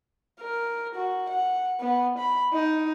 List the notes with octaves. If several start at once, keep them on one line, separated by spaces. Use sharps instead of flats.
A#4
F#4
F#5
B3
B5
D#4